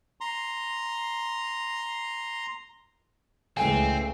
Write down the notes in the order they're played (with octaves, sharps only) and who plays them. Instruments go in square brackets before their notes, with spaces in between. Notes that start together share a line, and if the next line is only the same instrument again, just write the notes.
[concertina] A#5 C6
[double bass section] C#2 [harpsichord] A2 E3 G#3 [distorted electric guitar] C4 [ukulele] G#5